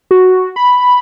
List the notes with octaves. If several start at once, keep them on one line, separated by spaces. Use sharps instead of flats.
F#4
B5